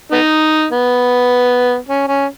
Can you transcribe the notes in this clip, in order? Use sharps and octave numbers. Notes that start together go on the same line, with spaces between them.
B3 D#4
B3
C#4
C#4